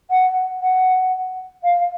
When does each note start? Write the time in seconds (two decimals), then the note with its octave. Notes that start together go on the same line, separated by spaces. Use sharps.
0.11 F#5
0.61 F#5
1.64 F5